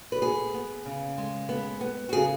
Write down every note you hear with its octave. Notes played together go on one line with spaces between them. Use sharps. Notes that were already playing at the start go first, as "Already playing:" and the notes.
B4
B3 G#4
B3
C#3
G#3
B3
B3
F#4
C#3 G#4